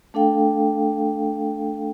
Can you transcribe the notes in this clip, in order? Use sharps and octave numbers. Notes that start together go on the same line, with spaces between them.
A3 D4 A4 F5 G5